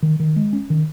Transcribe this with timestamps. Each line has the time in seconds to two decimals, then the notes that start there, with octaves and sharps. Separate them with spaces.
0.03 D#3
0.20 D#3
0.36 G#3
0.53 C#4
0.70 D#3